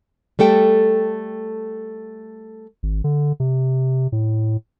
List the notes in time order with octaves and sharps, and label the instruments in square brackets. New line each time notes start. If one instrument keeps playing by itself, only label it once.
[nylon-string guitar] G3 A3 A4 G5
[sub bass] G#1
D3
C3
A2